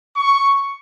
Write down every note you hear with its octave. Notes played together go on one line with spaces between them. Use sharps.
C#6